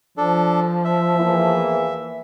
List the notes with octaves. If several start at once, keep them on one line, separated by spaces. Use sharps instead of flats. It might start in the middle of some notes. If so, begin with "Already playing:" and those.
F3 D4 A4
E5
E2 E3 A#3